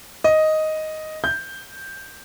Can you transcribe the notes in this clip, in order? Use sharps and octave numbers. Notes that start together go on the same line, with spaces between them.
D#5
G6